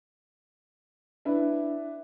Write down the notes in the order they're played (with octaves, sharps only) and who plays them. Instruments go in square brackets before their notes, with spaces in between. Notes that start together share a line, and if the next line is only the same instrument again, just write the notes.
[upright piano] D4 E4 B4